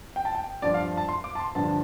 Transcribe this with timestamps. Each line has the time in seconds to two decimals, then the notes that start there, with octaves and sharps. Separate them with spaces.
0.16 G5
0.25 A5
0.35 G5
0.62 G2 F3 D4 D5
0.74 F5
0.97 A5
1.09 C6
1.24 D6
1.35 A5
1.39 C6
1.55 G1 G2 F3 D4 A5